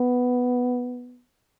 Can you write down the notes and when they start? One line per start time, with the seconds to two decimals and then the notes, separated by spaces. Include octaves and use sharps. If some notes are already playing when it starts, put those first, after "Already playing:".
Already playing: B3